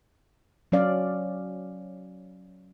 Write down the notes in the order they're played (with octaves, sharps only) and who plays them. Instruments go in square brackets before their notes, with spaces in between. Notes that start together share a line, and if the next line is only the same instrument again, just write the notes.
[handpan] F#3 C#4 D5 F5